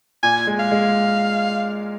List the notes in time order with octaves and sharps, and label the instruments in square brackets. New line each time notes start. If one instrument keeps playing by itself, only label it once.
[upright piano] A#2 [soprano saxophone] G#5
[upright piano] G#3
[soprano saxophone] F5
[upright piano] G#3